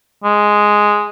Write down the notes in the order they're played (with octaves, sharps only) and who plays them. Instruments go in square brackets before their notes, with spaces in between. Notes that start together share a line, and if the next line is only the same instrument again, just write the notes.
[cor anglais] G#3